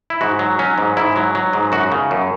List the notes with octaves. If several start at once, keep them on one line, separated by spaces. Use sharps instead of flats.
E4
G#2 F#4
F#3
F#3 C#4
G#2
G#2 E4
F#3
F#3
G#2
F#2 F#4
C#3
F#2